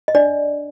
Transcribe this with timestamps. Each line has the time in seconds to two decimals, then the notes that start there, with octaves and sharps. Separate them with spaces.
0.08 D#5
0.15 D4 D5